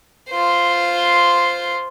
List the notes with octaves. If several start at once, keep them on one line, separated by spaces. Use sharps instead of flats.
F4 C5